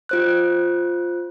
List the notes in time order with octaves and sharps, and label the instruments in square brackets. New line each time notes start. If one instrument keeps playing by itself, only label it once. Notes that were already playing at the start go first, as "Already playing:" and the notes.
[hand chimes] F4 C5 F#6